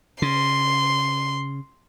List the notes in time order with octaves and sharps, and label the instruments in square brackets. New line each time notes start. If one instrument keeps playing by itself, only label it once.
[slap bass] C#3 [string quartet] C6